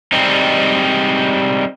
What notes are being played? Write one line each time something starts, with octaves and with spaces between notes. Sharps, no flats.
G3 G#3 C4 D#4